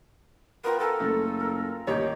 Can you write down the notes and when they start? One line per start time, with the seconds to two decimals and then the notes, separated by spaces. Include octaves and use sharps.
0.64 B3 F4 A#4 G5
0.80 A4 A#4 G#5 A5
1.00 F#1 A3
1.41 A#4
1.87 A1 D#2 D#4 G4 C#5